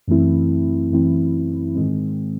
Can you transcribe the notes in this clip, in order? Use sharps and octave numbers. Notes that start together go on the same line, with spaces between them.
F#2 E3 A3 C4 E4
F#2 E3 A3 C4 E4
G#2 D#3 G#3 C4